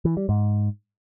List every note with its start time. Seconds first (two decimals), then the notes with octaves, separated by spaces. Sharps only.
0.05 E3
0.17 G3
0.29 G#2